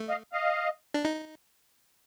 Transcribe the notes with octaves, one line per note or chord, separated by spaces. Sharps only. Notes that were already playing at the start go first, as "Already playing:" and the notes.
Already playing: A3
D#5 F5
D#5 F5
D4
D#4